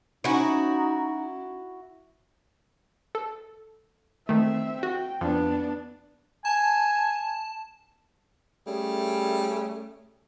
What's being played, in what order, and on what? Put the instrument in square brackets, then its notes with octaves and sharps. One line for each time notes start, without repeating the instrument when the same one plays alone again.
[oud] C#4 [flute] D#4 [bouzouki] E4 F#4
[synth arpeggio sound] A4
[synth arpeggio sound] D#3 A3 [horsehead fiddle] C4 E5
[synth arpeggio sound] F#4 [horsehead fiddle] G5
[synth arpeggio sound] F2 [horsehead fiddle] B3 D4
[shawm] G#5 [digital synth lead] A5
[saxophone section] G3 A3 C#4 G#4